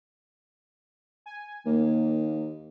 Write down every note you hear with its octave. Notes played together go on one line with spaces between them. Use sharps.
G#5
D#2 A#3